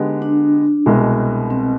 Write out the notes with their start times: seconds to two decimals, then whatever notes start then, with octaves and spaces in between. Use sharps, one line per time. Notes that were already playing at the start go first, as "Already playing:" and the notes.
Already playing: D3 G#3 B3 D#4 G4
0.22 D4
0.86 C2 B2 G#3
1.50 C4